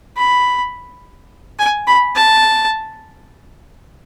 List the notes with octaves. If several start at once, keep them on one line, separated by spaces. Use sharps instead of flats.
B5
G#5
B5
A5